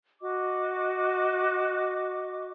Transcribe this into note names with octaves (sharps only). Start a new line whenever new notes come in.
F#4 D#5 D6